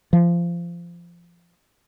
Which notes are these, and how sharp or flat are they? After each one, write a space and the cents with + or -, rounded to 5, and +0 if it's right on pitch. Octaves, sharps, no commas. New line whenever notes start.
F3 -20